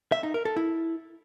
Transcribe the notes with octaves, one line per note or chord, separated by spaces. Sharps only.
E5
D#4
A#4
A4
E4